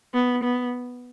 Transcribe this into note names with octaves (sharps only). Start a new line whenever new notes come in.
B3
B3